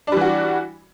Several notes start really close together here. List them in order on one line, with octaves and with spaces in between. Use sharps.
D4 G3 E3 F#4